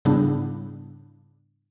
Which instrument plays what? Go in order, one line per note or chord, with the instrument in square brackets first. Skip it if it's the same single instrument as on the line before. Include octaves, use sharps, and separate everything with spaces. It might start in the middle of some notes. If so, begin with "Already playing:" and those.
[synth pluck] G#2 C#3 G3 B3 D4 E4